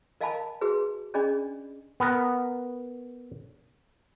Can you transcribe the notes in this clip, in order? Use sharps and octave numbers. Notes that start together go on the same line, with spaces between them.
A#4 D#5 F5 G#5 A5 B5
F#4 G#4 B4
C#4 D4 G#4 D5 D#5 B5
B3 A#4